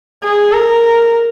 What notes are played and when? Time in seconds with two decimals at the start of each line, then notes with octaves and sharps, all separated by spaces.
0.24 G#4
0.53 A#4